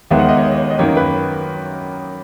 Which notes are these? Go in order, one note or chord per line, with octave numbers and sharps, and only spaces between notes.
D#2 D#3 G#3 B3 E5
F#5
D#5
C#5
D#5
F#2 D#3 A#3 C#5
B4